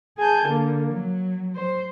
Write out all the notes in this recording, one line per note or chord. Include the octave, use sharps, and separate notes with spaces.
G#4 G#5 A5 G6
D3 A#3
F#3
C5